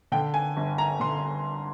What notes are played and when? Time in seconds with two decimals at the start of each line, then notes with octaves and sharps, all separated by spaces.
0.12 D3 G5
0.34 G#5
0.57 G1
0.78 A#5
1.00 D3 C6